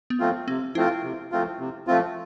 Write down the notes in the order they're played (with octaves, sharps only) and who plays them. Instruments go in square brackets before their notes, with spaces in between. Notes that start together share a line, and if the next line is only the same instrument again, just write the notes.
[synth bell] B3
[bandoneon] F3 A3 C4 F4
[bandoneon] C3 [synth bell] C4
[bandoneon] F3 A3 C4 F4 [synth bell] E4
[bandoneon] C3
F3 A3 C4 F4
C3
F3 A3 C4 F4